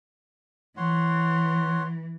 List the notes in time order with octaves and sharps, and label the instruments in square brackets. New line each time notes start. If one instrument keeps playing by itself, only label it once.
[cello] E3 [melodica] C#5 F#5 C6